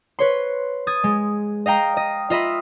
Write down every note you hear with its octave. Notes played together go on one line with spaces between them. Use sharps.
B4 C#5 C6
D#6 G#6 A6
G#3
D#5 F5 G5 A#5
D#5
F4 D#5 E5 B5